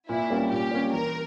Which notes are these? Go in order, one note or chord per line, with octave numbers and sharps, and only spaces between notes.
A#2 E4
G3 A#3 C#4
A#2 G4
G3 A#3 C#4
E3 A#4